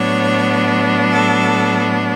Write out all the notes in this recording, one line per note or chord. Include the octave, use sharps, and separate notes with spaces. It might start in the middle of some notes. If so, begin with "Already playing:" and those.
Already playing: A2 F#3 B3 D4 C#5
A4